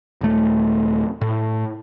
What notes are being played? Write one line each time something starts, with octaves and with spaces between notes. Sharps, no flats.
D#1 A3
A2